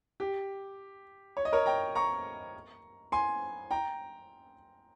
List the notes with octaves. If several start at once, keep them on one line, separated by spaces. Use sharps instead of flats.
G4
C#5
D#5
A#4 C#5
G5 A#5
A#5 C#6
G#5 C6
G5 A#5